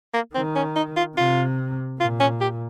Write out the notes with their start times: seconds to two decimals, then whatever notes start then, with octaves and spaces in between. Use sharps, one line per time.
0.14 A#3
0.35 D#3 C4
0.55 C#4
0.76 D#4
0.96 F4
1.17 C3 F4
2.00 A#2 F4
2.20 C#4
2.41 G4